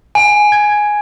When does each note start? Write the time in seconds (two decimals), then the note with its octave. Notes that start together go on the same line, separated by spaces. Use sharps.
0.15 G#5
0.52 G#6